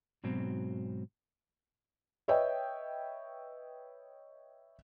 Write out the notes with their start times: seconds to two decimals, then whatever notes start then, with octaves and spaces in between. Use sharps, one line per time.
0.24 G#2 B2 F#3 C4
2.28 B4 C#5 D#5 E5 G5